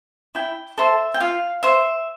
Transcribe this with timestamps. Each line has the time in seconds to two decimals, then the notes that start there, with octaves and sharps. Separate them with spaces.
0.35 E4 G5
0.78 A4 C5 E5
1.14 G5
1.20 F4 F5
1.63 C5 E5